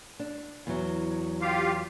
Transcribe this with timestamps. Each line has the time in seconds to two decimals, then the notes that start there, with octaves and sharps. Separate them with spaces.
0.19 D4
0.67 E2 F#3
1.41 F4 G4 F5